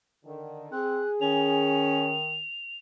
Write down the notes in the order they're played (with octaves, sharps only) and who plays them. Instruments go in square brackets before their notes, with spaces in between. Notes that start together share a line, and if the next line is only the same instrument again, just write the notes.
[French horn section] D3 D#3
[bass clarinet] C4 [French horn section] G#4 [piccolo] F#6
[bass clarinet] D#3 [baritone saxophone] C#4 [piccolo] F7